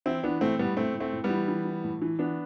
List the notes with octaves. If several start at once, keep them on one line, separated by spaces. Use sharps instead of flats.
E3 C4 E4
E3 B3 D4
A2 A3 C4
A2 G3 B3
A2 A3 C4
A2
A3 C4
A2
G3 B3
E3
E3
E3
A2
E3
E3 B3 D4